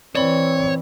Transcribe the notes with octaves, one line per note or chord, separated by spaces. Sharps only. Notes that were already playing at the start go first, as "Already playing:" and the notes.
E3 C4 C#5 D5 B5